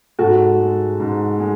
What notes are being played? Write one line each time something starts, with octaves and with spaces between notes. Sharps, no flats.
G#2 F#4 A4
G#3
G#2
G#3